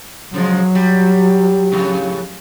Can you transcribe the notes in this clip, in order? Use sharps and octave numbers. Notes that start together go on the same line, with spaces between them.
C#3 F3 F#3 G#3
G3
F2 A2 C#3